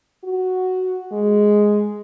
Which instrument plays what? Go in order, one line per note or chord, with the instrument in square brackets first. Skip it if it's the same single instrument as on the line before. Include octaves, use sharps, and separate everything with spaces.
[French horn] F#4
G#3